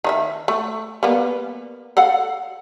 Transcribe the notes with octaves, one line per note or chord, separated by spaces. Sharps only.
D#3 D#4 E5
A3
G3 A#3 B3
A4 F5 F#5